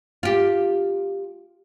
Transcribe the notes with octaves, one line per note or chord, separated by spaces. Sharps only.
F4 G4